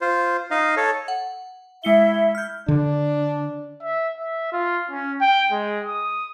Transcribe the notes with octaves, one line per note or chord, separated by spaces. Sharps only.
F4 C5
D#4 D#5 F5
A4 C#5
F#5
G#3 E4 E5 C#7 G7
F6 G6
D3 D4
E5
E5
F4
C#4
G5
G#3
D#6